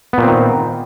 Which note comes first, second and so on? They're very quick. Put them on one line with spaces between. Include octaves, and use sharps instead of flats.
B3 A#2 C4 D#3